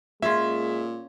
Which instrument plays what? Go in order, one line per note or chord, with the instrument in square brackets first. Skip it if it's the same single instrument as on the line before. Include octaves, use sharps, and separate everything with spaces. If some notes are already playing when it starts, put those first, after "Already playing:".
[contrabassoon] A#2 [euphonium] G#3 [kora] C#4 F4 [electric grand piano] E5